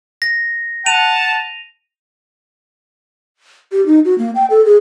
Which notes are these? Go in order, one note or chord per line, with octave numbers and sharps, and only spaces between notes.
A#6
F#5 A5 D#7 F7
G4
D#4
F#4
A#3
G5
A4
G#4